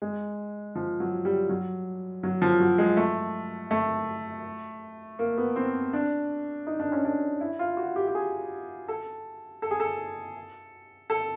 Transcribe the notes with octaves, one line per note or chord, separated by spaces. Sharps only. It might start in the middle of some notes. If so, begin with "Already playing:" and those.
G#3
F3
F#3
G3
F#3
F#3
F3
F#3
G#3
A3
A3
A#3
B3
C4
D4
D#4
D4
C#4
D4
E4
F4
F#4
G4
G4
G#4
A4
A4
G#4
A4
A4